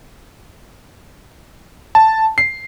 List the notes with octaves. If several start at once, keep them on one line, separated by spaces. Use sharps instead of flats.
A5
C7